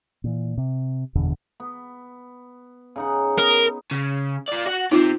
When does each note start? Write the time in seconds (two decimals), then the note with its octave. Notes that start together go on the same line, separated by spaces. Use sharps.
0.24 A#2 E3
0.58 C3
1.15 F#1 E2 B2 D3
1.60 B3
2.96 C#3 D#4 F#5
3.38 B3 A#4
3.91 C#3
4.49 F4 D5
4.66 F#4 F#5
4.92 C3 C4 D#4 F4